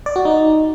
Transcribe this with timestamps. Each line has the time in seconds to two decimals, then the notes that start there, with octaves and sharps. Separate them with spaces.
0.06 D5
0.16 F#4
0.25 D#4